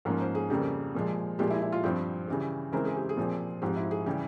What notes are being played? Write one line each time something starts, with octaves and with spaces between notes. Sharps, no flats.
G#2 F3 A#3 C#4
C5
G#4
F2 C#3 G3 A#3 G4
A#2 F3 G#3
A#2 F3 G#3 G4
E4
E4
F4
G2 F3 C4 G4
C#3 E3 G3
C#3 E3 G#3 C4 A#4
G#4
G4
G#4
A#2 F3 C4
G#2 F3 C4 G4
E4
G#4
C#3 E3 G3 G4